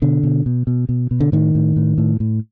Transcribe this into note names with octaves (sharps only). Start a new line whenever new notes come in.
B2 D3
B2
B2
B2
B2
B2
D3
A2 D#3
A2
A2
A2
A2